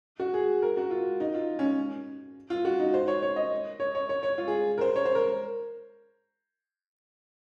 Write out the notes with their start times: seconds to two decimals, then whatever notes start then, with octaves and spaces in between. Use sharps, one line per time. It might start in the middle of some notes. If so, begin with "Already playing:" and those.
0.20 F#4
0.34 G#4
0.62 A#4
0.77 F#4
0.91 F4
1.20 D#4
1.34 F4
1.59 C#4
2.50 F4
2.65 F#4
2.79 D#4
2.94 C5
3.08 C#5
3.23 C#5
3.36 D#5
3.80 C#5
3.95 C#5
4.09 C#5
4.23 C#5
4.38 F4
4.48 G#4
4.78 A#4
4.81 C5
4.96 C#5
5.05 C5
5.15 A#4